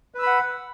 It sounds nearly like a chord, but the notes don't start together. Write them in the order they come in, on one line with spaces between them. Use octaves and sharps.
B4 E6 B5 F#5